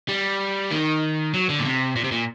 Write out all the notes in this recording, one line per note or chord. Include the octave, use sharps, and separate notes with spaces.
G3
D#3
F#3
D3
A#2
C3
A#2
C3
A#2